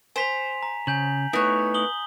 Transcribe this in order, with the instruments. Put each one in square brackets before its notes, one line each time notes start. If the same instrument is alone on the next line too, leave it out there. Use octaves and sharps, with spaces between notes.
[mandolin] C5 [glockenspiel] G#5 B6 F7
[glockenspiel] A#5
[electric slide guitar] C#3 [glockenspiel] G#5 G6 F#7
[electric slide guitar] A3 D#4 E4 [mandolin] B3 C#5
[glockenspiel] D#6 F#7 G7